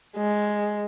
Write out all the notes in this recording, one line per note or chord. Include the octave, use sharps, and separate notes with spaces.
G#3